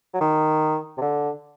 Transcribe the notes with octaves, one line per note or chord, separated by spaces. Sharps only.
F#3
D#3
C3
D3